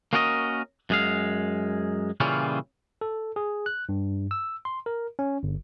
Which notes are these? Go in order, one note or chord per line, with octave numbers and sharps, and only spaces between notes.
A#3 C#4 F#4 A#4 D5 D#5
F#2 G#3 F5
A#2 C#3 E3 G3 C#4 F4
A4
G#4
F#6
G2
E6
C6
A#4
C#4
G1